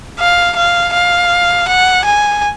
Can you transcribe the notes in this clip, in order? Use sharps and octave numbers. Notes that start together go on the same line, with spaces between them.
F5
F5
F5
F#5
G#5